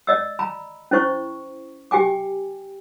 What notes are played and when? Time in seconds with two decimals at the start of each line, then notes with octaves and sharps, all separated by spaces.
0.07 D5 D#5 E6
0.39 A#5 B5
0.91 C#4 E4 C5 C#6
1.91 G4 G5 G#5 D6